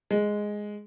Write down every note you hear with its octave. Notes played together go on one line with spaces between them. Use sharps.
G#3